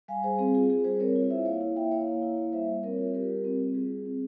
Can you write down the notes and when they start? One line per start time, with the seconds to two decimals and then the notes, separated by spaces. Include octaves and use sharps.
0.08 G3 F5 G#5
0.23 G3 G#4 C5
0.39 C4 G#4
0.54 F4 G#4
0.70 G3 G#4
0.84 G3 G#4 C5
1.00 C4 A#4 C#5
1.16 F4
1.30 E4 C5 E5
1.45 A#3 C#5 F5
1.61 E4
1.76 A#3 E5 G5
1.92 E4 C#5 F5
2.08 A#3
2.22 E4
2.38 A#3
2.52 G3 C5 E5
2.68 G3
2.83 C4 A#4 C#5
2.98 F4
3.14 G3 G4 A#4
3.29 G3
3.44 C4
3.60 F4
3.74 G3 G#4
3.91 G3
4.06 C4